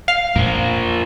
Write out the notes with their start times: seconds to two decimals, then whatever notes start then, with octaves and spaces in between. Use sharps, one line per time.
0.08 F5
0.36 F2 A#2 F3 A#3